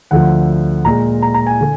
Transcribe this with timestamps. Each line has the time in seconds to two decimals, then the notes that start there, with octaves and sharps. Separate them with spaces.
0.11 D2 D3 F3 F#5
0.85 A#2 G#3 A#5
1.22 A#5
1.34 A#5
1.47 G#5
1.61 D3